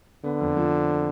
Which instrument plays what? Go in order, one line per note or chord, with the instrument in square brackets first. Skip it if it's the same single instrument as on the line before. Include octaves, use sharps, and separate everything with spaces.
[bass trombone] D3 [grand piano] B3
[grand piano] F2
F3